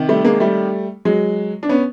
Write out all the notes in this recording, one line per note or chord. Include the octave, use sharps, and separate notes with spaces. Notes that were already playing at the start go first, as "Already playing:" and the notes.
Already playing: C3 D#3
G3 A3
G#3 A#3
G3 A3
F#3 G#3
D4
B3 C#4